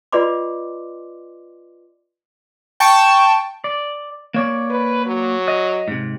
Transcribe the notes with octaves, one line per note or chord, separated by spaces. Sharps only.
F4 B4 D5 D#5 C6 D6
G5 A5 C#6
D5
A#3 C#5 D5
B4
F#3
D#5
G#2 C3